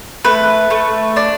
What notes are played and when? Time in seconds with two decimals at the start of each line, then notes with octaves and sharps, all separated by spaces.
0.25 A3 B4
0.70 A3
1.16 D4 D5